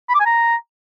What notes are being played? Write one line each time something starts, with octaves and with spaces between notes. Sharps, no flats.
B5
D6
G#5
A#5